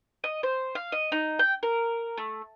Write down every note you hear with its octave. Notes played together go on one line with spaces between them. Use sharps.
D#5
C5
F5
D#5
D#4
G5
A#4
A3